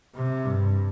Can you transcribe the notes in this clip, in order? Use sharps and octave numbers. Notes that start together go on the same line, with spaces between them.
C3
G2